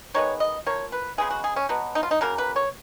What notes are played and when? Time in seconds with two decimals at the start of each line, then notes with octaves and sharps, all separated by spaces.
0.14 D#3 G#3 B3 C#5
0.40 D#5
0.66 F3 A#3 C#5
0.92 B4
1.18 C#3 G#3 B3 G#4
1.30 F#4
1.44 G#4
1.56 C#4
1.69 B2 F#3 B3
1.95 D#4
2.03 F4
2.11 D#4
2.21 C#3 F#3 A#3 A#4
2.38 B4
2.56 C#5